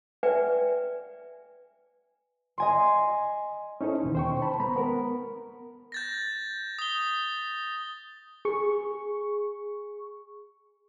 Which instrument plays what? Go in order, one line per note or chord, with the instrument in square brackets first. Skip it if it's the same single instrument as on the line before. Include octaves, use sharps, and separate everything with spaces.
[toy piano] B4 D5 E5 G5 G#5
[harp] D#5 G#5 C6
[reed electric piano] C#4 D#4 E4 A4 C5
D#2 B2 D#3
C5 G5 C#6
C5 A5 B5
G#3 B3 A#5 B5
B3 A#4
[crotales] G6 A6 A#6
D#6 G7
[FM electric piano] G#4 C#6